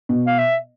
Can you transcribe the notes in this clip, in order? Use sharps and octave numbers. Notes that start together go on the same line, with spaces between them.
B2
F5
E5